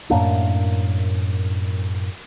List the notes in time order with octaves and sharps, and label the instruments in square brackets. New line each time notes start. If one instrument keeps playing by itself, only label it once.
[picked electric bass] F#2 A2 A#3 D4